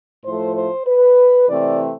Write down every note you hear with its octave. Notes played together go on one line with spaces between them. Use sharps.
A2 F3 A3 C5
C5
B4
C3 E3 A3 C4 D5